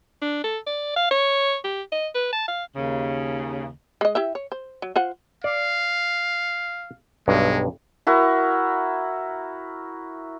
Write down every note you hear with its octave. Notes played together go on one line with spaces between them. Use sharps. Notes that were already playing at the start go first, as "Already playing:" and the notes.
D4
A4
D5
F5
C#5
G4
D#5
B4
A5
F5
D#2 C#3
G#3 D#5
E4 G4 E5
C#5
C5
F#3
F4 C5 F#5
D5 F5
B1 G2 G#3
E4 F#4 A#4